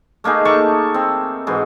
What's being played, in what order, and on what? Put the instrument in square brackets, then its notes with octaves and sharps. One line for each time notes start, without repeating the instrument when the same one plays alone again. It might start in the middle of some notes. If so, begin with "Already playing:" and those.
[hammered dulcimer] A3 A#3 D#4 G#4
A3 A#3 A5 C#6
C4 C6
G#2 E3 F#4 C6